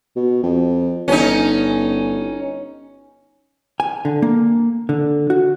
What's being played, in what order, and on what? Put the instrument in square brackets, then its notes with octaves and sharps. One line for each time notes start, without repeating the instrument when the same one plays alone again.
[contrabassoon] B2
F2
[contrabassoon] G1 [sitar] C#4 D#4
[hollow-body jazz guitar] G#5
D3
A#3
D3
F#4